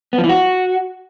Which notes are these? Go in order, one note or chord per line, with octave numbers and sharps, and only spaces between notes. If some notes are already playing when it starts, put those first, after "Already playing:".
B3
F3
E3
F#4